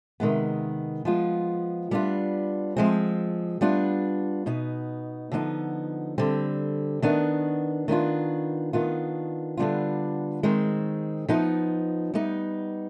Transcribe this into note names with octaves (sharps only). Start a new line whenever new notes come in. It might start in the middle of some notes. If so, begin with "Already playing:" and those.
C3 D#3 G#3 B3
F3 G#3 B3 F4
G3 B3 D4 F4
F3 G#3 C4
G3 B3 D4 F4
B2 B3 D#4
D3 F3 B3 D#4
D3 G3 C4
D#3 B3 D4
D#3 B3 D4 F4
D#3 B3 D4 F4
D3 G3 B3 D4 F4
D#3 G#3 C4
F3 B3 D#4
G3 B3 D#4